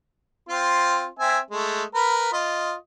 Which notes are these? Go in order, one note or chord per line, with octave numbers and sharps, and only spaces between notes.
C4 F4 C6
C4 E5 G#5
G#3 A3
A#4 B4 B5
F4 D#5